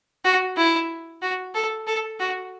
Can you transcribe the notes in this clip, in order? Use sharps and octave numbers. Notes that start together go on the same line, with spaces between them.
F#4
E4
F#4
A4
A4
F#4